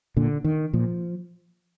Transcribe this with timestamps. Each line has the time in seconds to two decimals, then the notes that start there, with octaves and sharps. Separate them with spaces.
0.17 A#2 D3
0.44 D#3
0.73 A#2 F3